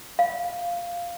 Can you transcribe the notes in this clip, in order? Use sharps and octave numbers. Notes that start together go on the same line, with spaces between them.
F5